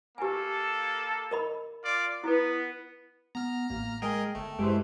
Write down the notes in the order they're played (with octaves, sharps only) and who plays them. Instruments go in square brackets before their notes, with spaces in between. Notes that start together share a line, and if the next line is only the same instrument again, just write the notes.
[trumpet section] A#3 A4 [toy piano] G4 G#5
[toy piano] A#4 D#5 B5
[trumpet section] F4 D5
[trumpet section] B3 [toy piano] E4 B4
[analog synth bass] B3 [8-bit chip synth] A#5 F6
[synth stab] A1 [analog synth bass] A#3
[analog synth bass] G#3 [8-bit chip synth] G#4 A#4 D#5 [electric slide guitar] G5
[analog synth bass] G1 [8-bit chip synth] A3
[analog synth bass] G2 [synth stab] G#3 E4 C5 [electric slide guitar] G4 B4